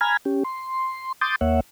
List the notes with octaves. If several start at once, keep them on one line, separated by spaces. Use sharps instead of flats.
G#5 A#5 B5 F6 G#6
C#4 G4
C6
C6 D6 D#6 G6 A6
D#2 A#3 C#5 E5 F#5